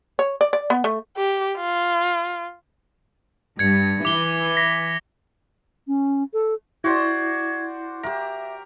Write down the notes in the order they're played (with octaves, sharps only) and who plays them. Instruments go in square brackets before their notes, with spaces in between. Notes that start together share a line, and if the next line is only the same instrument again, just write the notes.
[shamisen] C#5
D5
D5
B3
A3
[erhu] G4
F4
[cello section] G2 [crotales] G#6 C#7
[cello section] E3 [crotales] D6 G7
[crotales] A#6 B6
[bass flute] C#4
A4
[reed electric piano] E4 [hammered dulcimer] F#4 C5 D5 [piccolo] G#6
[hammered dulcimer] G4 A#4 [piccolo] E5